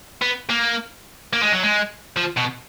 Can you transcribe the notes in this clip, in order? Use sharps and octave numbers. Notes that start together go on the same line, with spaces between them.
B3
A#3
A#3
G#3
F#3
G#3
F3
B2